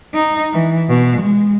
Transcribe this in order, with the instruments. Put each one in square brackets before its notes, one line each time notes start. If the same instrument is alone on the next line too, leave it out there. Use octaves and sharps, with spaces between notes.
[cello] D#4
E3
B2
G#3